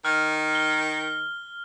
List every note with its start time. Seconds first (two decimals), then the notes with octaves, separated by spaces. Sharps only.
0.05 D#3 F6
0.55 G7